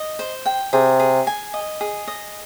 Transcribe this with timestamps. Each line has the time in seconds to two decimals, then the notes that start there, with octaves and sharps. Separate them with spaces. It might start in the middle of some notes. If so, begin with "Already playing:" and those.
Already playing: D#5
0.19 C5
0.46 G5
0.73 C3 G#4
1.00 G#4
1.27 G#5
1.54 D#5
1.81 G#4
2.08 D#5